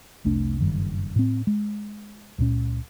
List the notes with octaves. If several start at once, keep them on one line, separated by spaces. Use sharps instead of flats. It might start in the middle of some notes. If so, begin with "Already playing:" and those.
F1 C2 A3 D4
F#1 G2 D#3
A2 C4
G#3
C#2 A#2 C#4